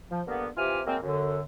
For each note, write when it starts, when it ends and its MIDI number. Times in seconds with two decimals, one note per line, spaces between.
0.11 0.22 53
0.27 0.47 43
0.27 0.47 50
0.27 0.47 58
0.27 0.47 59
0.58 0.81 48
0.58 0.81 52
0.58 0.81 65
0.58 0.81 67
0.58 0.81 80
0.58 0.81 89
0.87 0.97 54
0.87 0.97 56
0.87 0.97 58
0.87 0.97 60
1.03 1.40 42
1.03 1.40 50